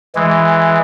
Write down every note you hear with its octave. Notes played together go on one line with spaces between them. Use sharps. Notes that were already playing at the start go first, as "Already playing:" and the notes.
E3 G#3